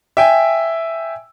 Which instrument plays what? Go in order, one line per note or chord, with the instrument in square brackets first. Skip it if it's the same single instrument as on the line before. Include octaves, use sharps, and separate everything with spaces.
[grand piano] E5 G5 G#5